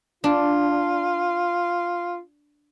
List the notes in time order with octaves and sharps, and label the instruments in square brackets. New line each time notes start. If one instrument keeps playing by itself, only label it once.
[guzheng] D4 [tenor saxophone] F4